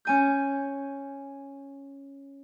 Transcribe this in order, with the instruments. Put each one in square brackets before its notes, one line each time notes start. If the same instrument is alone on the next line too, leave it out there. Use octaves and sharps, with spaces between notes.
[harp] C#4 G#5 G6